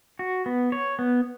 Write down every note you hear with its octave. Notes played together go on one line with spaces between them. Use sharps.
F#4
B3
C#5
B3